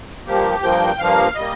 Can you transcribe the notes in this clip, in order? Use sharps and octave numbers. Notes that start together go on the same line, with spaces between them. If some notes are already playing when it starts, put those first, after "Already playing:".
G2 F3 A#3 G4
G2 F3 A#3 G5
G2 F3 A#3 F5
G3 A#3 D#5